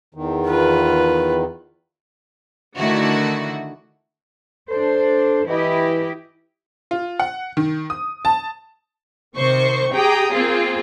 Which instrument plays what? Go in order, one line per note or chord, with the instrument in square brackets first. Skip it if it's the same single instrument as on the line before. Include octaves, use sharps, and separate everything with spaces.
[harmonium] E2 D#3
[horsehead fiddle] F4 B4
[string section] D3 D#3 A3 D4 E4 F#4
[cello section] D4 C5 [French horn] A4
[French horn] E3 [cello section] E4 G4 D#5
[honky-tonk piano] F4
F#5
D#3
D#6
A5
[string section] C3 D#3 C5 C#6
G4 G#4 G5 A#5 D#6
A#3 C4 F4 G#4